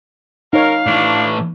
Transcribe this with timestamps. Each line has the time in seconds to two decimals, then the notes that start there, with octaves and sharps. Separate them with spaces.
0.53 D#4 A#4 C#5 F5
0.86 A2 E3 D4